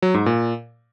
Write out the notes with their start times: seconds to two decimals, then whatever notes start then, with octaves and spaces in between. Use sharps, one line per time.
0.02 F#3
0.14 G#2
0.26 A#2